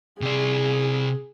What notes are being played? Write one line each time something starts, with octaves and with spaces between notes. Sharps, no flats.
C3 G#4 D5